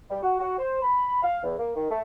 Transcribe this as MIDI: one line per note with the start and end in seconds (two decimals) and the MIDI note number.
0.10 0.18 55
0.22 0.36 66
0.40 0.57 66
0.58 0.80 72
0.82 1.19 83
1.23 1.39 77
1.43 1.55 40
1.59 1.71 58
1.76 1.88 51
1.90 2.00 57